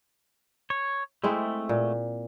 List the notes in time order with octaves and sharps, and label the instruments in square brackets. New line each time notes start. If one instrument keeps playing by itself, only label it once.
[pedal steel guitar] C#5
[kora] G#3 C4 E4 [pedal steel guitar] A3
[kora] A#2